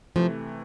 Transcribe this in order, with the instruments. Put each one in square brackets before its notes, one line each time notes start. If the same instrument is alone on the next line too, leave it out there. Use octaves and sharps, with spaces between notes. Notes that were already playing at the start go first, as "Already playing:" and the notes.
[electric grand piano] C3 E3 A3 [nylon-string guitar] F3